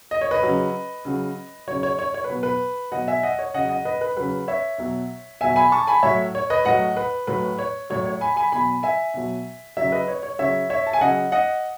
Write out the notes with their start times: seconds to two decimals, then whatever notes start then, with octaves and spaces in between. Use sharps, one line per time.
0.11 D#5
0.21 C#5
0.31 B4 D#5
0.43 C#3 F#3
1.05 C#3 F#3
1.67 C#3 F#3 C#5
1.83 C#5
1.99 C#5
2.14 C#5
2.24 B4
2.29 B2 F#3
2.43 B4
2.92 B2 F#3 D#5 F#5
3.07 E5 G#5
3.23 D#5 F#5
3.39 C#5
3.54 C#3 F#3 D#5 F#5
3.69 D#5 F#5
3.85 B4 D#5
4.01 B4
4.17 C#3 F#3 B4
4.48 C#5 E5
4.78 B2 F#3
5.41 B2 F#3 E5 G#5
5.56 G#5 B5
5.72 A5 C#6
5.87 G#5 B5
6.03 A2 F#3 C#5 E5
6.35 C#5
6.50 B4 D#5
6.65 A2 F#3 D#5 F#5
6.97 B4
7.27 A2 F#3 B4
7.59 C#5
7.90 A2 F#3 C#5
8.06 C#5
8.21 G#5 B5
8.36 G#5 B5
8.52 B2 F#3 G#5 B5
8.83 E5 G#5
9.14 B2 F#3
9.77 C#3 F#3 C#5 E5
9.92 B4 D#5
10.08 C#5
10.23 C#5
10.39 C#3 F#3 C#5 E5
10.70 C#5 E5
10.87 A5
10.93 G#5
11.01 C#3 F#3 D#5 F#5
11.32 D#5 F#5